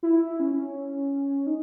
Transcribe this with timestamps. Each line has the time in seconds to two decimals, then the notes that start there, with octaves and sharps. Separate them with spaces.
0.03 E4
0.40 C#4
1.47 D#4